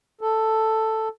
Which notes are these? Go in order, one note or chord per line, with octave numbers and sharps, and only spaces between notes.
A4